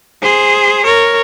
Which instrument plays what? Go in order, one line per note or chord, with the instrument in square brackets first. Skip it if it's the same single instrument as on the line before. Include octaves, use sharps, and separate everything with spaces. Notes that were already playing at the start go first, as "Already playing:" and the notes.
[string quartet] G#4 C5
A#4 C#5